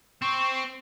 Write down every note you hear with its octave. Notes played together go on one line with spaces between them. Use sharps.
C4 C#6